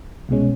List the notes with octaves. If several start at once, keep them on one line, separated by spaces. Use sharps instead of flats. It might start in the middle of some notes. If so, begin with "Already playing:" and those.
C2 B2 G#3 C#4